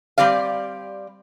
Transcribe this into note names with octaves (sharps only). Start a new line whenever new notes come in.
G3 C4 G4 D5 F5